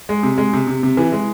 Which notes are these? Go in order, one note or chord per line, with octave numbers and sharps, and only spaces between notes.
G#3
C3
G#3
C3
C3
C3
E3
G#3